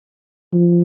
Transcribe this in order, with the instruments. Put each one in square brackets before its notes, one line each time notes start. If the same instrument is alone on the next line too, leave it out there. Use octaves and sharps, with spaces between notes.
[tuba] F3